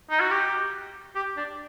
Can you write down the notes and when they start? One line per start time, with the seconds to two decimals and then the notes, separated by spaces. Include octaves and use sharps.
0.10 D#4
0.20 F#4
0.31 G4
1.15 G4
1.37 D4